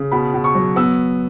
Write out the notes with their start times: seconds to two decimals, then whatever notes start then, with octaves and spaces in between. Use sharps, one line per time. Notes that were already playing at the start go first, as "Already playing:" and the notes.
Already playing: C#3
0.12 B2 B5
0.34 B2
0.44 C#6
0.55 F#3
0.76 B3 E6